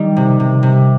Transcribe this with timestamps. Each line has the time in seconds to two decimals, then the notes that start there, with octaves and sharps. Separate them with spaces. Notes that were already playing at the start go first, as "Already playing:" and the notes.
Already playing: D#3 G3
0.17 C3
0.40 C3
0.63 C3